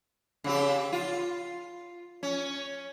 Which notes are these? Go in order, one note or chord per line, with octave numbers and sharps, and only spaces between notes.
C#3 C4 G4
F4
C#4